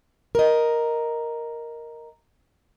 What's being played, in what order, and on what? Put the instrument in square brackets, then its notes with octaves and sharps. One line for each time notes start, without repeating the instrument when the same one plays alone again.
[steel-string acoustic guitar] A#4 D#5